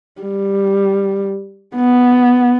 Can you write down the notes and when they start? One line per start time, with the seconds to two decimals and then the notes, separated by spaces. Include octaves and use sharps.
0.22 G3
1.75 B3